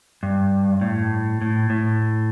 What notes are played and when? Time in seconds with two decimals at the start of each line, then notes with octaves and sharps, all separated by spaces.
0.23 G2
0.81 A2
1.41 A2
1.70 A2